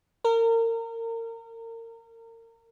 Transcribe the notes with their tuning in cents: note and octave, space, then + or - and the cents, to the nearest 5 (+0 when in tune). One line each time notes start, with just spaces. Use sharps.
A#4 -30